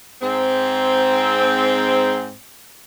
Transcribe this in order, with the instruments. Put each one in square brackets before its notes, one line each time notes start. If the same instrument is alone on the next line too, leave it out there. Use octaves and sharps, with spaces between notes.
[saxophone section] G#2 C4